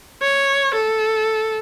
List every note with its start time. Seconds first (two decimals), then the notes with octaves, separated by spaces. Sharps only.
0.22 C#5
0.74 A4